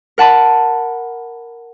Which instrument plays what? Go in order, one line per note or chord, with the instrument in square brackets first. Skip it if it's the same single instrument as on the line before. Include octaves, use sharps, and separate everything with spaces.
[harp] A#4 F#5 A5 B5